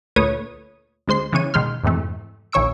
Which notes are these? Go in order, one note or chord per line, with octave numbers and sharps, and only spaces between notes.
D2 A#2 A3 B4 C#5 D#6
D2 G#3 C5 C6 C7
C#3 E3 B3 C#5 D#7
B2 D#3 G#3 C6 F6
F2 G#2 C3 E3 A3
A#1 D#2 C#5 C#6 E6 D7